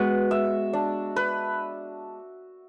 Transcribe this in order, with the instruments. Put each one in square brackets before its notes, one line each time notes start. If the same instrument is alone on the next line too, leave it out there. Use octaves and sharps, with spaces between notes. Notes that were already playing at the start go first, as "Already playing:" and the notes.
Already playing: [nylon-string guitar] G#3 B3 [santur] F#4
[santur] E5
D4
B4